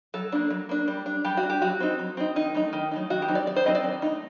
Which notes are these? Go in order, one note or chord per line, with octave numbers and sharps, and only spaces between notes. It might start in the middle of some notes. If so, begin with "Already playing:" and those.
F#3 A4
A#3 D4
F#3
A#3 D4
G3
D4
G3 G4
F#4
D4
G4
F#3 F#4
C4 D#4
F#3
C4 D#4
D#3 D#4
F#3 A3 D#4
D#3
F#3 A3 D#4
D#3 F#4
G4
F#3 C4 D#4
D5
D#3 D5
C5
F#3 C4 D#4 D#5
D5
D#3
A3 C4 D#4